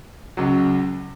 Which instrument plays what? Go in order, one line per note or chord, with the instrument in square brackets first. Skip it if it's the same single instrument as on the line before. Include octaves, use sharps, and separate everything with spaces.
[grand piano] C#2 C#3 F#3